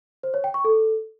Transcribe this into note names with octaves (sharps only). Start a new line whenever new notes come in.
C5
C#5
G5
C#6
A4